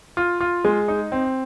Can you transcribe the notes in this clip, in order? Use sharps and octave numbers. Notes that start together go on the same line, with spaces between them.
F4
F4
G#3
D#4
C4